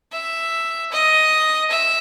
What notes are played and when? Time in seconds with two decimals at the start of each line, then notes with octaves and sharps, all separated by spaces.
0.12 E5
0.92 D#5
1.70 E5